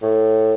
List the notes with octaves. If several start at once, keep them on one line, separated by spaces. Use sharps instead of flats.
A2